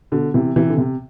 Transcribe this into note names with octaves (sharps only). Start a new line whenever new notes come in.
B2 D3
C3 E3
C3 E3
D3
C3